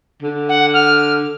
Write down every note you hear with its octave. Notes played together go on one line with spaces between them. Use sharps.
D3
F#5
F6